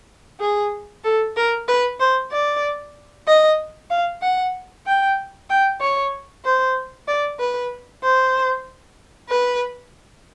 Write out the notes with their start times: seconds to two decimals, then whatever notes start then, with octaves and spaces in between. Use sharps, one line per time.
0.40 G#4
1.04 A4
1.36 A#4
1.68 B4
2.00 C5
2.32 D5
3.27 D#5
3.91 F5
4.22 F#5
4.86 G5
5.50 G5
5.81 C#5
6.45 C5
7.07 D5
7.39 B4
8.04 C5
9.30 B4